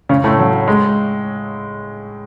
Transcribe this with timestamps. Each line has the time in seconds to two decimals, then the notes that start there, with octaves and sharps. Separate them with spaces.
0.09 C#3 C#4
0.24 A2 A3
0.39 F#3
0.68 G#3